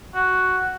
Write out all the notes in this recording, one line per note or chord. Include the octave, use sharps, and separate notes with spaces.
F#4